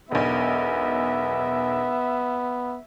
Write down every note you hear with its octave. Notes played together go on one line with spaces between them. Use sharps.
E1 B1 B3 E5